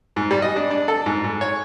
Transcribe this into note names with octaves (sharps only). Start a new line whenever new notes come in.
G#2
G3
D#5
D4
D4
A4
G#2
G#2
C#5